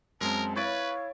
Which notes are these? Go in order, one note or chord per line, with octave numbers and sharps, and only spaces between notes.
F#2 G#3 C4 A#4 A5
E4 B4 C#5 F5 A6 D7